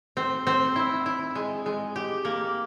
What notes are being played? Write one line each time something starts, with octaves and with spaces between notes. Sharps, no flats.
C4
C4
E4
E4
G#3
G#3
G4
A#3